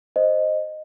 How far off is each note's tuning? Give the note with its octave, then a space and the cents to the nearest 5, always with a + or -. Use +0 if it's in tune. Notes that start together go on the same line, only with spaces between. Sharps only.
C5 +0 D#5 -10